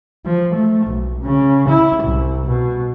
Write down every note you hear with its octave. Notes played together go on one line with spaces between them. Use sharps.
F3
A3
B1
C#3
E4
C2
B2